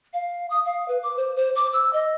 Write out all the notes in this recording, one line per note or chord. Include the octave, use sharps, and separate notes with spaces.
F5
D#6
F5
B4
D6
C5
C5
D6
E6
D#5